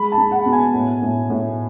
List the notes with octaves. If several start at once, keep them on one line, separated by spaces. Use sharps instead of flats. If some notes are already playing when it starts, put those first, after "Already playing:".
Already playing: G#3 B5
A5
G#3
F#5
B2
G#5
A2
A2
A2